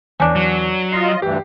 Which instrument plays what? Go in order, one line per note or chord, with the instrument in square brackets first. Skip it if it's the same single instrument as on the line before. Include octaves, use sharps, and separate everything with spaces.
[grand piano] E2 [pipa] C#4 D4
[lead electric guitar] F#3
[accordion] F4 D#5 [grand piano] C7
[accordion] D2 G2 E3 [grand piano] G4